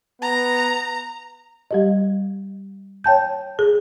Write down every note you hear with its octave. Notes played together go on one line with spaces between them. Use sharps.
B3 A#5
G3 G4 D#5
C#5 G5 A5 G6
G#4